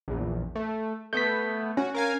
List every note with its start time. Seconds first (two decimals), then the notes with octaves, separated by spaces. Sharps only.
0.08 A#1 E2
0.55 A3
1.13 A3 B3 G6 B6
1.77 C#4 F#4
1.95 A#4 F5 G#5